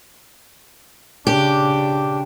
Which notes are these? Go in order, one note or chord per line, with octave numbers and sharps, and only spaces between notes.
C#3 D4 G4